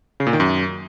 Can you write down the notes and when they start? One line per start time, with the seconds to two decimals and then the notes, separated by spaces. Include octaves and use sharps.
0.20 C#3
0.27 A#2
0.33 D#3
0.40 F#2